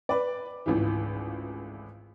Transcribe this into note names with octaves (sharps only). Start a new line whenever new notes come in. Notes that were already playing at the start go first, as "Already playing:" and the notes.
B4 D5
G#1 C#2 A2 E3